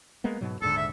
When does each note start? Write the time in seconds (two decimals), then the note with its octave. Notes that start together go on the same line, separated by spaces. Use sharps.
0.24 G#3 A#3 B3
0.41 G#2 B2 F#3
0.62 D#1 G#2 D3 A4
0.77 E5